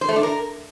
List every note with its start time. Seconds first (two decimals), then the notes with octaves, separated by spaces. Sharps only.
0.01 C5
0.09 A3
0.16 D4
0.23 A#4